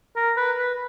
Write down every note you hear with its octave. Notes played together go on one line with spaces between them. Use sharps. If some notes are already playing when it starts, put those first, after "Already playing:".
A#4
B4
B4